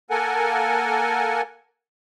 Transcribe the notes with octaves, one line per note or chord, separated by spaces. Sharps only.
A#3 A4 A#4 F#5 G#5